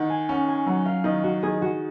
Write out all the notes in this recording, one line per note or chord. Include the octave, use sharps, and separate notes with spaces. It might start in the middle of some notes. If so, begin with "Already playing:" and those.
Already playing: D#3 F#5
G#5
C#4 F#5
G#5
F#3 F#5
F5
D#3 D#5
F#4
D#3 G#4
F#4